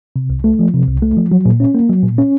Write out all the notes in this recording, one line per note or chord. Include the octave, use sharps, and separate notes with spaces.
C3
C2
A3
F3
C3
C2
A3
F3
F#3
A#2
C#4
A#3
F#3
A#2
C#4